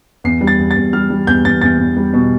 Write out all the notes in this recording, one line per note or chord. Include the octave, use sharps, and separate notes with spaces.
E2 C7
G3
A6
E2
A6
E2
G3 F6
G3
E2 G6
E2 A6
E2 A6
E2
G3
B2